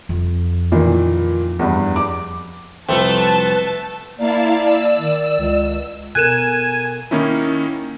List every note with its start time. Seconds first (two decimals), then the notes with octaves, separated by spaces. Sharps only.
0.09 F2
0.72 A#2 D#3 E3
1.59 E2 G2
1.96 D6
2.89 C2 F2 A3 C4 B4 A5
4.19 A#3 E4 D5 F5 A5
4.64 E6
4.96 D#3
5.39 C#2
6.15 B2 A4 A#4 G#5 F#6 D#7 E7
7.11 D#3 A#3 C#4 D#4 E4